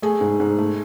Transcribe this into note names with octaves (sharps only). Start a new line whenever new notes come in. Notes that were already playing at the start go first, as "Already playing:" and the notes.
A3 G#4
G#2
G#2
A3